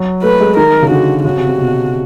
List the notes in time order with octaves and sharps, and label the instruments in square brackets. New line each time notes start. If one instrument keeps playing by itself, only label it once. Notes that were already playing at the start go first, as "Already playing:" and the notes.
Already playing: [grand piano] F#3
[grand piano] A3 [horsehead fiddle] B4
[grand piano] G#3
[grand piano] D#3 [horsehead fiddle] A#4
[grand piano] C#3
[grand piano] D3 [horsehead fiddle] F#4
[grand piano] C#3 [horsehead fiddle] F#4
[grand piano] C3
C3
B2